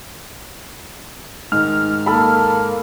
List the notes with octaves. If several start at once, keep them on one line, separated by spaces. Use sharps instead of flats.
G#2 D#3 D#4 F6
A#3 A4 B5